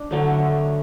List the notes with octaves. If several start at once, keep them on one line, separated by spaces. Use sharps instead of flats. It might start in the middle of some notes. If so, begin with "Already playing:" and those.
Already playing: D4
D3 F#3 A3